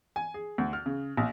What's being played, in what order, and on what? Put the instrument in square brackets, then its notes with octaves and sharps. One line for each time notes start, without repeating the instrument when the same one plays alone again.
[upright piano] G#5
G#4
D2
F6
C#3
A#1